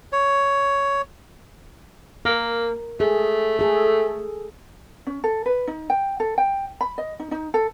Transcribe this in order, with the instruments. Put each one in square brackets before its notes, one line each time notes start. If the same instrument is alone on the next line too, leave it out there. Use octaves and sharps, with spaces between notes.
[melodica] C#5
[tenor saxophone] A#3 [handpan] A#4
[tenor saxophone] A3 [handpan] G#4
[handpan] G#4 A4
[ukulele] C#4
A4
B4
D#4
G5
A4
G5
B5
D#5
D#4
D#4
A4